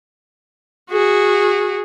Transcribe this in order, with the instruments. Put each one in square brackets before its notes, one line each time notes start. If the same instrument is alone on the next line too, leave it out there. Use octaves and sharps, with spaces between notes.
[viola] F#4 G#4